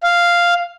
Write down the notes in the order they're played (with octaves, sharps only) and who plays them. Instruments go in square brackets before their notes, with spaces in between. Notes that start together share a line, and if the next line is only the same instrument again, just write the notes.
[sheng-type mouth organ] F5